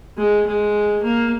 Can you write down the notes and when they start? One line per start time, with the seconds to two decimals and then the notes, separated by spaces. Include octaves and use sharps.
0.17 G#3
0.47 G#3
1.03 A#3